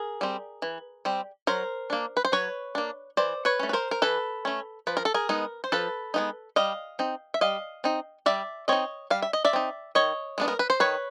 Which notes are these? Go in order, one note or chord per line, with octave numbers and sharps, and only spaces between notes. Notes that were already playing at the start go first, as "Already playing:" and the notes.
Already playing: G#4 A#4
G3 C4
E3
G3 C4
F#3 A#4 C5
A#3 D4
B4
C5
F#3 B4 C#5
A#3 D4
E3 C5 D5
B4 C#5
A3 C#4
B4
A#4 C5
A#4
E3 A4 B4
A3 C#4
F3 B4
A#4
A4
G#4 A#4
G#3 B3 D#4
C5
F3 A4 B4
G#3 B3 D#4
G3 D#5 F5
C4 D#4
E5
G3 D#5 F5
C4 D#4
G3 D5 E5
C4 D#4 C#5 D#5
G3 F5
E5
D#5
D5 E5
C4 D#4
D#3 C#5 D#5
G#3 B3 D4
A#4
B4
C5
D#3 B4 C#5